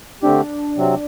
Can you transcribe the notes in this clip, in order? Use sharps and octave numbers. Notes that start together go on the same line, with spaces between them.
D3 A3 C4 D4 G4
C3 F#3 C4